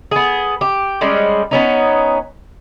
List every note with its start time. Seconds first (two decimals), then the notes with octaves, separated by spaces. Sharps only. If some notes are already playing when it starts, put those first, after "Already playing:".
0.11 B3 G#4
0.61 G4
1.01 G3 G#3 C#4
1.51 B3 C#4 D#4